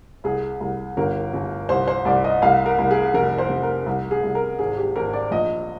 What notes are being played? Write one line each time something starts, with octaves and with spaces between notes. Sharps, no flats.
C2 G#4
C2
G1 A#4
G1
C2 C5
C5
C2 D5
D#5
C2 F5
A#4
C2
G#4
F1 A#4
C5
F1
A#4
C2
G#4
C2
A#4
G#1 G#4
G4
G#1 A#4
D5
A#1 D#5